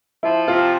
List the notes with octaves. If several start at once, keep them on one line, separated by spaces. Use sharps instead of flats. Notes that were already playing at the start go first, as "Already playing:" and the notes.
F3 E4
C3 F4